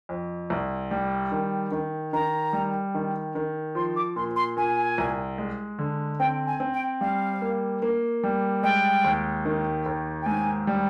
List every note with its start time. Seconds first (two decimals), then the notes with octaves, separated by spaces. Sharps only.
0.09 F2
0.50 C2
0.91 G3
1.32 D#3
1.72 D#3
2.13 D#3 A#5
2.53 G3
2.95 D#3
3.35 D#3
3.75 F3 C6
3.96 D6
4.16 A#2 C6
4.36 C6
4.57 A#2 G#5
4.98 C2
5.38 G#3
5.79 D3
6.19 C4 G5
6.47 G#5
6.60 C4
6.73 G5
7.01 G3 F5
7.42 A#3
7.82 A#3
8.23 G3
8.63 G#3 G5
9.04 D#2
9.45 D#3
9.86 D#2
10.22 G5
10.26 G#2 G#5
10.67 G3